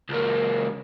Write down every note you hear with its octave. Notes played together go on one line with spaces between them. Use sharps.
C#2 A#3